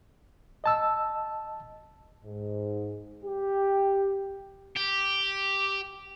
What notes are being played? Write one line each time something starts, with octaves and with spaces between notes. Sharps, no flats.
D#5 A5 E6
G#2
G4
G4